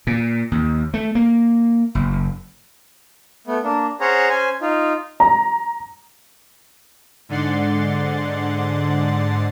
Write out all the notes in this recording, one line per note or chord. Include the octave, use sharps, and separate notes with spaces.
A#2
D#2
A3
A#3
F#1
A3 B3
A#3 D4
C#4 G#4 C5 C#5 F#5 A#5
C#4 C5 G#5
D#4 F4
A#5
G#2 D3 D5 F#5 C6 A6